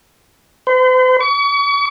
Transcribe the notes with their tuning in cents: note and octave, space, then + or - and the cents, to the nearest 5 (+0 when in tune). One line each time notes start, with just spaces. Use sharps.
C5 -45
C#6 +40